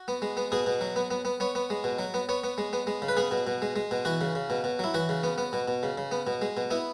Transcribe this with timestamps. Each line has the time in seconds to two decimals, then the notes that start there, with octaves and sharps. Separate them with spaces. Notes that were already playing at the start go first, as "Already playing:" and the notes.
Already playing: F#4
0.08 B3
0.22 G#3
0.37 B3
0.52 B2 G#4
0.66 B2
0.81 F#3
0.96 B3
1.11 B3
1.25 B3
1.40 B3 C#5
1.55 B3
1.70 G#3
1.84 B2
1.99 F#3
2.14 B3
2.29 B3 C#5
2.44 B3
2.58 G#3
2.73 B3
2.87 G#3
3.02 C#3
3.08 B4
3.17 B3 G#4
3.31 B2
3.47 B2
3.62 G#3
3.76 G#3
3.91 B2
4.05 E3 F#4
4.21 C#3
4.35 C#3
4.50 B2
4.64 B2
4.79 F#3 E4
4.94 E3 F#4
5.09 C#3
5.24 B3
5.38 B3
5.53 B2
5.68 B2
5.83 C#3
5.98 C#3
6.12 B3
6.27 B2
6.42 G#3
6.57 B2
6.71 B3 E4